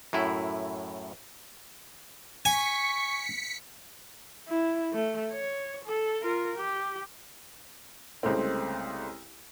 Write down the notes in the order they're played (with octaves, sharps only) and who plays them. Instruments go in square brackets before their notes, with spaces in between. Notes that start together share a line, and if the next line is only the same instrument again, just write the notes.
[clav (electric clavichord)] F#2 A2 E4
[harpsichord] G#5 [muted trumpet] C#6 [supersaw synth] B6 C#7
[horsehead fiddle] E4
A3
C#5
A4
F4 A#4
G4
[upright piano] C2 C#3 G#3 A3 C4